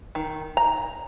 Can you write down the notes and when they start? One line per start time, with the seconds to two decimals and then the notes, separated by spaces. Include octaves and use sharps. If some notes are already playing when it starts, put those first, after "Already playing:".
0.15 D#3
0.57 A#5